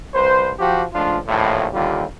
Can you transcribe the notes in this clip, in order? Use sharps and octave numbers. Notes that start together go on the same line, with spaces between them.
C2 B4 C5
F3 F#4 G4
C#2 F3 A3 D4 F4
A#1 D#2 A2
D#2 D3 G3 F4 G4